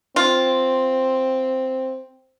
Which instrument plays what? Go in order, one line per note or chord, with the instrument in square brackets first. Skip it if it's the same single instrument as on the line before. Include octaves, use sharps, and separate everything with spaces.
[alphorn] C4 [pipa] F4